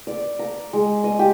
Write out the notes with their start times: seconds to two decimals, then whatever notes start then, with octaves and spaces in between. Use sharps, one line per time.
0.07 D5
0.39 A#5
0.73 G#3
1.04 D#5
1.19 G4